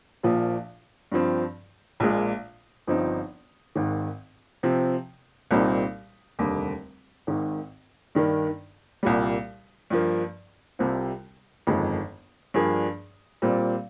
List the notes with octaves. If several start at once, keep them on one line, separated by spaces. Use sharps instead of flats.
A#1 A#2 F3
G2 F3 C4
A#1 A#2 G#3
G1 G2 F3 C4 D#4
G#1 G#2 D#3
C3 F3 C4
C2 A#2 G3 C4 D#4
F1 D#2 D3 G3
G#1 G#2 D#3
G2 D#3 A#3 D4
C2 A#2 G3
G2 F3 A#3
C2 C3 G3 C4 F4
G1 F2 D#3 G#3
G2 F3 A#3 D4 G#4
A#2 G3 C4